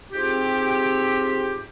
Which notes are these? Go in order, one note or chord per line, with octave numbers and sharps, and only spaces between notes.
G#2 C4 F4 G4